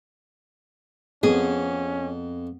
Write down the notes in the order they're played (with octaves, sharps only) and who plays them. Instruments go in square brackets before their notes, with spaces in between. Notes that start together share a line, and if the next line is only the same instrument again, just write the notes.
[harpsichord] F2 [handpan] B3 [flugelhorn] C#4 [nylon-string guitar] G#4